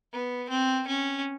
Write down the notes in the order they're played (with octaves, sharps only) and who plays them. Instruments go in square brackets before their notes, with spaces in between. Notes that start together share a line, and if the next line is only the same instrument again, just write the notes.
[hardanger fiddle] B3
C4
C#4